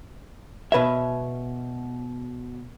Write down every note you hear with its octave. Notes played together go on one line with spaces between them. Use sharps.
B2 B4 C#5 E5